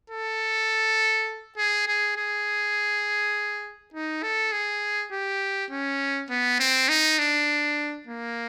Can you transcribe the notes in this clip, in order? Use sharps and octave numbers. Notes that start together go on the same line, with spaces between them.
A4
G#4
G#4
G#4
D#4
A4
G#4
G4
C#4
B3
C4
D#4
D4
A#3